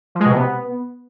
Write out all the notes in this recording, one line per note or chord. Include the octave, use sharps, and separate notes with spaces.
F3
G#3
B2
C3
B3